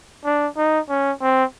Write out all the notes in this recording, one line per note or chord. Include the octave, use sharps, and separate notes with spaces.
D4
D#4
C#4
C4